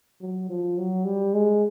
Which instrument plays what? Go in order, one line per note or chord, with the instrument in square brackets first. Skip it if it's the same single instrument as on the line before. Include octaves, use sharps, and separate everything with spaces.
[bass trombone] F#3
F3
F#3
G3
G#3